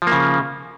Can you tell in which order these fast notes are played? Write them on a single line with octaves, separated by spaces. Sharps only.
F3 A#3 C#3